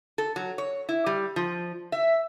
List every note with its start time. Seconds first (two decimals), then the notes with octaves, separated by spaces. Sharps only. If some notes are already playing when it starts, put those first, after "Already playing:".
0.18 A4
0.36 F#3
0.58 C#5
0.89 E4
1.06 G3
1.36 F3
1.92 E5